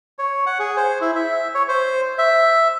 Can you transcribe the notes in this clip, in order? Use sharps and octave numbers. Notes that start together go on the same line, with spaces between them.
C#5
F#5
G#4
C5
E4
E5
C#5
C5
E5